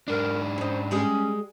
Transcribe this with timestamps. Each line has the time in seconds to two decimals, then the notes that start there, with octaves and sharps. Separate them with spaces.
0.08 G#2 D4 A#4
0.58 C#4 D#4 C5
0.91 G3 G#3 C#4 G#4